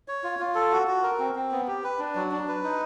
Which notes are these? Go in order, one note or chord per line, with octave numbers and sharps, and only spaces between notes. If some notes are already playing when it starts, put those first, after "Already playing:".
C#5
F4
F4
A4
F#4
F#4
A#4
C4
C4
B3
G4
B4
D4
F#3
D4
B4
D#4